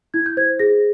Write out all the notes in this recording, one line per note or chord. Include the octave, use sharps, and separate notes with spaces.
E4 G#6
G6
C5 G#6
G#4 A#6